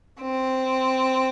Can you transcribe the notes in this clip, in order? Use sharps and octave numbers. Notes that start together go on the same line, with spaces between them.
C4